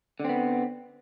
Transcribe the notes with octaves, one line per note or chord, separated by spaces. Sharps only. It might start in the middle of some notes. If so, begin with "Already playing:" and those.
D3 B3 C4